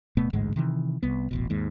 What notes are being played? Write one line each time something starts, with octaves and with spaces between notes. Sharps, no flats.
D1 B2 A3 B3
A1 D2 G#2 G#3
C3 D#3 E3
C2 B3
D#1 A1 B2
D#2 G#2